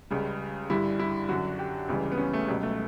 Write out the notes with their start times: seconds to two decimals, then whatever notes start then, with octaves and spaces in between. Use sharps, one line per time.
0.10 C#2 C#3 G3
0.70 G2 D3 G3 E4
0.99 E4
1.29 F#2 D3 F#3 F#4
1.59 G4
1.88 C#2 C#3 E3 G3
2.12 B3
2.18 C#4
2.33 A3
2.48 C#2 B2 F#3 G3
2.63 A3